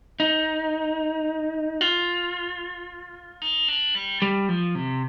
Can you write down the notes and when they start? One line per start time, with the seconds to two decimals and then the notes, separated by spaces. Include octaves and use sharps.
0.20 D#4
1.81 F4
3.42 D#4
3.68 D4
3.95 G3
4.22 G3
4.49 F3
4.75 C3